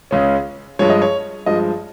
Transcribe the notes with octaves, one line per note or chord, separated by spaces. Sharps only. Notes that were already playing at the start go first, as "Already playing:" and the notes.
C#2 C#3 G#3 C#4
G2 F3 G#3 C#5
D#5
C#5
G2 F3 G#3 D#5